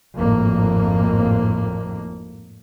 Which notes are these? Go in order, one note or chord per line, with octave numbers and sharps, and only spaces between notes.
G#1 F2 A2 A#3